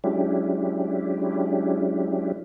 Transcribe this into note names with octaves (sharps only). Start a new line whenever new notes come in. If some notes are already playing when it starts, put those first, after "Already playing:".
F#3 G#3 C#4 D4 E4 G4